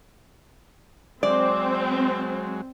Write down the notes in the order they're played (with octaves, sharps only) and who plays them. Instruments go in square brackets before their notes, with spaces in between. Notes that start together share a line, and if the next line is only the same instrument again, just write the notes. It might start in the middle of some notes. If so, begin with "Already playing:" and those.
[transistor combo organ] F#3 G#3 [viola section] C4 [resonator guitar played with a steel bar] D5